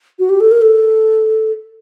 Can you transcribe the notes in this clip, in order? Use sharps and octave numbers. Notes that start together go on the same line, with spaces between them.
F#4
G4
A4
A#4
A4